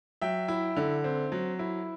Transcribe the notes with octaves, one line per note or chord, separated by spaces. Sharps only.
F#3 E5 G5
E4
D3
C4
F#3
E4